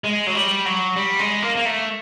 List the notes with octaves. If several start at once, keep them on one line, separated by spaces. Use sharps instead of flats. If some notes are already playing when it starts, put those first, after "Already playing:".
G#3
F#3
G3
F#3
G3
G#3
A#3
A#3
A3